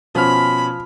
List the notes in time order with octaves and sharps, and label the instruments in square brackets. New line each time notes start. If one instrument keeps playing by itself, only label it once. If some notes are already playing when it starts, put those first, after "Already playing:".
[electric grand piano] B2 C#4 F6 [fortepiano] F3 [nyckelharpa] B5